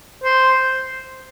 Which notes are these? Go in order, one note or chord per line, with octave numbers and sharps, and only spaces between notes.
C5